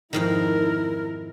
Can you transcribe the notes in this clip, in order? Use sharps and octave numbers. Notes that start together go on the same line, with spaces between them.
F2 G#2 D#3 E4 A#4